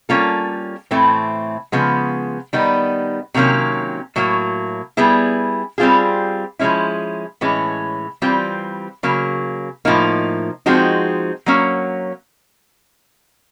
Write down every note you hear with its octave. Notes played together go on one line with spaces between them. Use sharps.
G3 A#3 C#4 F4 A4
A2 E3 A3 C4
C#3 F3 G#3 B3
D#3 G3 B3 D#4
C3 D#3 F#3 A#3 C#4
A2 F#3 A#3
G3 B3 E4 G#4
G3 C4 F4 G#4
F3 G#3 C#4 E4
A2 E3 G#3 C#4
E3 G3 C4 F4
C#3 F#3 A#3
A2 F3 A#3 D#4
F3 G#3 C4 D#4 F#4
F#3 A#3 C#4